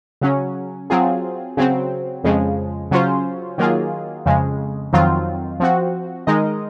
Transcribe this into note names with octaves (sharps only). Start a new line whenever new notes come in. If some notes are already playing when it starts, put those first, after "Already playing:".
C#3 F#3 C#4
F#3 C4 F4 G#4
C#3 F#3 C4
F2 C#3 F3 G#3
C#3 F#3 C#4 F4 C5
D#3 F#3 A#3 F4 G#4
F2 C#3 G#3
F2 D#3 F#3 C4 F4
F3 C4 F#4
D#3 G#3 D#4 A#4 D#5